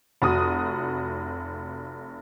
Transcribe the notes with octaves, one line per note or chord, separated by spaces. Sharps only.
F1 F#4 D#6